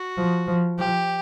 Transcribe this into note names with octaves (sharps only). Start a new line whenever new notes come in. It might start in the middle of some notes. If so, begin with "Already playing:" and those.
Already playing: F#4
F3
F3
F3 G4